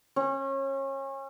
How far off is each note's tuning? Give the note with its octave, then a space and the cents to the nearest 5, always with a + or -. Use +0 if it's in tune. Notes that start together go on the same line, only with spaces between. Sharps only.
C#4 -30